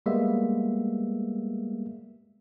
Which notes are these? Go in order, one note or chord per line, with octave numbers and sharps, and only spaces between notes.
G3 G#3 A#3 B3 E5